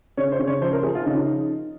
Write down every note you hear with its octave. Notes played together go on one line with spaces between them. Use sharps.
C#3 C#5
C5
C#3
C#5
F3 C5
A#4
F3 G#4
F4
C#3 D#4